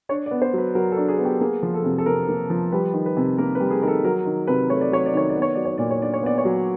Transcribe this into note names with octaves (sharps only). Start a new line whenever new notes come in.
D4 C#5
D5
B3
C5
F#3 B4
F#3 A#4
A4
D4
G#4
B3
G4
A#3 G#4
F3
A4
C3
A4
C3 A#4
A#3
F3
G3 B4
D#3
B4
C3
A#3 A#4
B4
G3
G#4
D#3 A#4
A4
F#3 A#4
D#3
C3 B4
A3 C#5
D5
F#3 C#5
D5
D#3 C#5
D5
B3
C#5
F#3 D5
C#5
A#2 D5
C#5
D4 D5
C#5
B3 D5
C#5
F#3